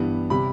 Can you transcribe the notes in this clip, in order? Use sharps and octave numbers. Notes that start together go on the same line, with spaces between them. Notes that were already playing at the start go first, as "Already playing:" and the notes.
Already playing: G2 E3 G3 B3
C3 G3 B5